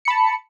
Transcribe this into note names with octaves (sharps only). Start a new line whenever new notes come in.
A5 B5 C#7